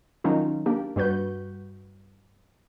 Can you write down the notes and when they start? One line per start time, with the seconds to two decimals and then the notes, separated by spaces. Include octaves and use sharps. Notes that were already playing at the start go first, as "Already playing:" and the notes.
0.24 D#3 F#3 C#4 D#4 F4
0.66 A#3 D4 G4
0.96 G2 G3 F#4 B4 G6